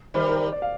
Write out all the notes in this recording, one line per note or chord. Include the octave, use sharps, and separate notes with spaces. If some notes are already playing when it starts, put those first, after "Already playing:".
D#3 G3 C5
A#4
C5
D5
F5